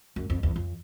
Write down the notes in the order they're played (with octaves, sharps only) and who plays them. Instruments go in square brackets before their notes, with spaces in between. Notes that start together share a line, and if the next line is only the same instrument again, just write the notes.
[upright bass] F#2
F2
E2
F2